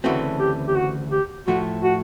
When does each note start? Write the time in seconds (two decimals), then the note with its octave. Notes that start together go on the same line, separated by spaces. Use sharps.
0.04 D2 C#3 E3 A3 C4 F#4
0.40 G4
0.68 G4
0.76 F#4
1.11 G4
1.47 A2 F3 A3 F#4
1.83 F#4